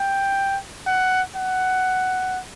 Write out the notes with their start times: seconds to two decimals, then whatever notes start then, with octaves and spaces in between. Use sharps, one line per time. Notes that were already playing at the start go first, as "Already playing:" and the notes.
Already playing: G5
0.87 F#5
1.36 F#5